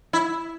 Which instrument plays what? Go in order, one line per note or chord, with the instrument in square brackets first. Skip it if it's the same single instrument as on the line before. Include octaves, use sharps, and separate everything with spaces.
[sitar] E4